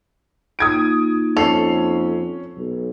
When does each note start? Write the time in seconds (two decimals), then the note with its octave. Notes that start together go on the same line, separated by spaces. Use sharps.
0.59 A#3 D#4 F4 D#6 G#6 D7
1.37 F2 C#4 A4 C7 F7
2.57 B1